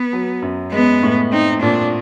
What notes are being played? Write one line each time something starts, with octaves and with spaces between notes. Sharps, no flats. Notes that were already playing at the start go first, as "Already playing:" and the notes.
Already playing: B3
F#3
F#2
G#3 B3
A2
C4 D#4
A#2 D4